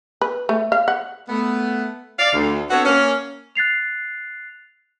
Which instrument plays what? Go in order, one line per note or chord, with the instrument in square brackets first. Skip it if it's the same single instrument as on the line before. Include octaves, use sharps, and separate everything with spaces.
[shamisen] B4
A3
F5
F#5
[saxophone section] A3 B3
D5 F5
D2
B3 C4 D4 F#4 A4 C#5
A#3 C#4
[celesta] F#6 A6 C7 F7